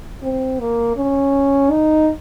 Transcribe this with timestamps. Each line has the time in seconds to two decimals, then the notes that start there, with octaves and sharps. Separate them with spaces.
0.23 C4
0.60 A#3
0.97 C#4
1.72 D#4